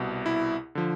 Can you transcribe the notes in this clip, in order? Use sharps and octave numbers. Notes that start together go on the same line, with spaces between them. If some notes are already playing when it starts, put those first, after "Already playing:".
Already playing: C2 B2
E4
D3 F3